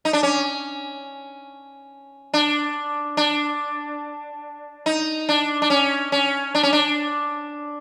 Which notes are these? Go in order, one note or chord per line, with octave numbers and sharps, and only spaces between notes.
D#4
D4
C#4
D4
D4
D#4
D4
D4
C#4
C#4
D4
C#4
D4